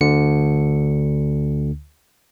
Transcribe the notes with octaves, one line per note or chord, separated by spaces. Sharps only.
D2 D3 C#7